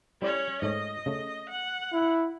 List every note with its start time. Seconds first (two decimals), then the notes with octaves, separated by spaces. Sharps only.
0.22 G3 C#4 E4 C#5 D5
0.62 G#2 A3 C#5 D#5
1.06 C#3 A3
1.50 F#5
1.93 E4